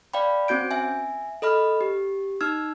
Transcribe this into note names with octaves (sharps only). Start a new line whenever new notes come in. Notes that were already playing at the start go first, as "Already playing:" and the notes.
D5 F5 G5 B5
C4 C#4 F#4 G6 D7
E5 G#5
A4 D#5 B5 F6
G4
D#4 E6 F6 G#6